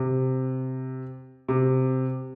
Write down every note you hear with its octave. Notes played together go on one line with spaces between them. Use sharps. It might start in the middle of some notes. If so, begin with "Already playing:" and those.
Already playing: C3
C3